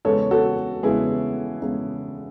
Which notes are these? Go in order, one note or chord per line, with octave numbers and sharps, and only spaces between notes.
E2 C#3 G#3 B3 A4 C#5
F#4 A4
E2 C#3 G#3 B3 E4 G#4
E2 C#3 G#3 B3